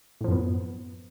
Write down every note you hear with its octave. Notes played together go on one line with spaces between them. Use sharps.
F#2 A2 F3 B3